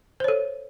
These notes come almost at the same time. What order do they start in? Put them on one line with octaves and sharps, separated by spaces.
C5 C#5 A4